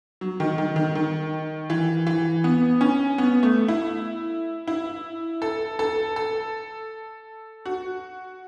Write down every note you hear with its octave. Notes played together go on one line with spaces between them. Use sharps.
F#3
D#3
D#3
D#3
D#3
E3
E3
B3
C#4
B3
A3
E4
E4
A4
A4
A4
F#4